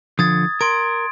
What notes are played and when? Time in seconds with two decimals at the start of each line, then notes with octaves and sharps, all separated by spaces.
0.19 D3 F3 D#6 G#6 A6
0.61 A#4 C6 G#6 D7